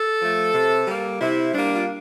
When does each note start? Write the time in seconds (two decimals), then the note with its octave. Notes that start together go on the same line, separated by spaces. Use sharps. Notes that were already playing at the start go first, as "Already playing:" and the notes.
Already playing: A4
0.20 F3 A3
0.54 C3
0.87 G3 A#3
1.20 C3 E4
1.53 G3 A#3 D4
1.75 F4